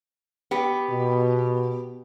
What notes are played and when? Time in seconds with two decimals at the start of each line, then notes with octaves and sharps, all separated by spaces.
0.51 B3 G4
0.89 B2